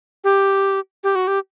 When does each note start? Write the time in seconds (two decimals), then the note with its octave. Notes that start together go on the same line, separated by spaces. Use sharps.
0.24 G4
1.04 G4
1.15 F#4
1.27 G4